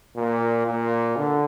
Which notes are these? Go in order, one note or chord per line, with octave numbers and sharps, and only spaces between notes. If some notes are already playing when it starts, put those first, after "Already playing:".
A#2
A#2
D3